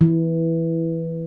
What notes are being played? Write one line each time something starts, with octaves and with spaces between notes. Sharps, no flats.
E3